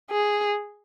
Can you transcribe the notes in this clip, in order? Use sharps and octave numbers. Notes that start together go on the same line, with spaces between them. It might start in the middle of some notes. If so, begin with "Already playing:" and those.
G#4